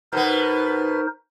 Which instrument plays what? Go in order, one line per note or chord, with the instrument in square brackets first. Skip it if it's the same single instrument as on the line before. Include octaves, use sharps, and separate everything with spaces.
[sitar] B2 B3 [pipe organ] D#4 A#4 C5